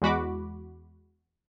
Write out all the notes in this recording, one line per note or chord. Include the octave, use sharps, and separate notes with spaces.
E2 G#3 F#4 B5 D6